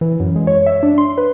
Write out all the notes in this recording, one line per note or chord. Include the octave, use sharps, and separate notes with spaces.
E3
F#2
G#3
C#5
E5
D4
C6
B4